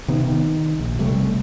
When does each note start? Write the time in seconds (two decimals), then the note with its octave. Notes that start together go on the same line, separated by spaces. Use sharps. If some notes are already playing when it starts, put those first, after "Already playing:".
0.08 C3 D#3 B3
0.24 D#3
0.79 A#1
0.99 F1 C3 G3 A3